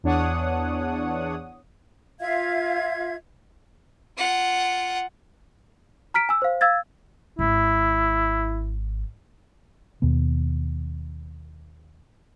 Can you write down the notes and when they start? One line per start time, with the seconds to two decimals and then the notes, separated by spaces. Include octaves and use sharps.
0.03 E2 D4 C#5 F#5 D#6
2.20 F4 E5 F5 G#6
4.17 F4 F#5
6.14 A#5 F6 B6 D7
6.29 G#5 E6
6.42 C5 F5
6.61 F5 E6 G#6 A6
7.39 G#1 E4
10.02 D#2 B2 B3